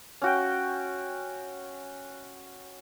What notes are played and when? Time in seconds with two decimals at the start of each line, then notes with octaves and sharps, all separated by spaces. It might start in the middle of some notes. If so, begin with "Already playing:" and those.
0.22 C#4 F#4 G5